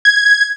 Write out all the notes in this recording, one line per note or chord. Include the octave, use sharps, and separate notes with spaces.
G#6